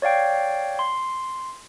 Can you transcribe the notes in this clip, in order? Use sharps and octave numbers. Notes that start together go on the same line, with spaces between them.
C#5 D5 F5 G5
C6